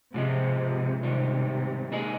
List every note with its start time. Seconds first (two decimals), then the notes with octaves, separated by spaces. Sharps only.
0.14 G#2 C3 F3 G#3
1.03 G#2 C3 D#3 G3
1.92 A#2 G#3 D#4 G#4